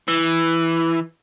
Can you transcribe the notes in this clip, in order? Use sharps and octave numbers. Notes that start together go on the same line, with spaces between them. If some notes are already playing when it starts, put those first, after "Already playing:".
E3